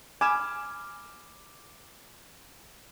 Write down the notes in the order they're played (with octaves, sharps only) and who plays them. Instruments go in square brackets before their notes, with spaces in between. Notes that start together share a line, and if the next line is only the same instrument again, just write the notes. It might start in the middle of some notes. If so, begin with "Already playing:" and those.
[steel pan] G#5 [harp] B5 F6 [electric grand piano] D6 E7